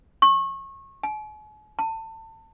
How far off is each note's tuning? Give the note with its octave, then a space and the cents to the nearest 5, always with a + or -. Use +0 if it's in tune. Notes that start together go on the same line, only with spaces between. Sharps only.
C#6 -30
G#5 +45
A5 +30